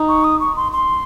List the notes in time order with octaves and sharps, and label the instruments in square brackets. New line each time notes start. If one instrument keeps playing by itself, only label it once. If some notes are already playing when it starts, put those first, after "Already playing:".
Already playing: [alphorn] D#4
[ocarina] C#6
D#6
C#6
C6
C6